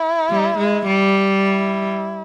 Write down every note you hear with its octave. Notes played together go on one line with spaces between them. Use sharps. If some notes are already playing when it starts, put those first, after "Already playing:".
Already playing: E4
G3
G#3
G3
E4